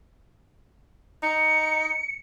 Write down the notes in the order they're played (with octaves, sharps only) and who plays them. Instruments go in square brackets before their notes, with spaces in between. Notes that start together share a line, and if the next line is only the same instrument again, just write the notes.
[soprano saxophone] D#4 [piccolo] C#7